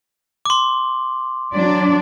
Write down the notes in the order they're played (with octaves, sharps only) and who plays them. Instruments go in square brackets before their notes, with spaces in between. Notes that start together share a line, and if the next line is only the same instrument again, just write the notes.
[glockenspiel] C6 D6
[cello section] F#3 D4 D5